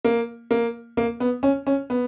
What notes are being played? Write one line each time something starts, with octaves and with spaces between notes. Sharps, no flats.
A#3
A#3
A#3
B3
C#4
C#4
B3